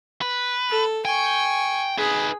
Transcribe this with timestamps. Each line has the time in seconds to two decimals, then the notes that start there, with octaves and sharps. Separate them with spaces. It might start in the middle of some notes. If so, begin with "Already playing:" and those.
0.21 B4
0.70 A4
1.05 G5 G#5 C#6
1.98 D#4 G#4 B4